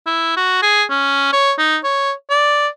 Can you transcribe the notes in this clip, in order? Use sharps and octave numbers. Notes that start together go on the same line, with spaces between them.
E4
F#4
G#4
C#4
C#5
D#4
C#5
D5